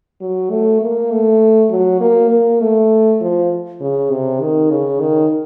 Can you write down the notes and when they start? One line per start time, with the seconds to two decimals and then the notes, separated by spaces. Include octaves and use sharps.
0.21 F#3
0.51 A3
0.81 A#3
1.11 A3
1.70 F#3
2.01 A#3
2.30 A#3
2.61 A3
3.21 F3
3.81 C#3
4.10 C3
4.40 D#3
4.70 C#3
5.00 D#3